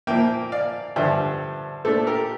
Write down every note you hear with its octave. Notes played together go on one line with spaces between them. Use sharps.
A#2 F3 A#3 E5 G5
D5 F5
G2 D3 F3 C5 E5
A#2 A3 D4 A4 C5
G4 A#4